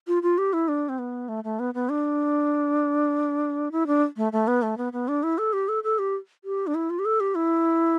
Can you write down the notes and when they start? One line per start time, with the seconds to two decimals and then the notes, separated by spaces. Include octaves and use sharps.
0.08 F4
0.23 F4
0.38 G4
0.53 E4
0.68 D4
0.89 C4
0.99 B3
1.29 A3
1.44 A3
1.59 B3
1.74 B3
1.89 D4
3.72 E4
3.87 D4
4.17 A3
4.33 A3
4.48 B3
4.62 A3
4.77 B3
4.93 B3
5.08 D4
5.23 E4
5.38 A4
5.53 G4
5.68 A4
5.84 A4
5.99 G4
6.44 G4
6.67 D4
6.75 E4
6.90 F4
6.99 G4
7.05 A4
7.20 G4
7.35 E4